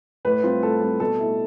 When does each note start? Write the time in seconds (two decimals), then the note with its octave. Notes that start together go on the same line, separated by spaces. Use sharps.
0.25 A2 B4
0.43 G3 C4 F4
0.63 A2 A4
0.81 G3 C4 F4
1.00 B2 A4
1.19 A3 E4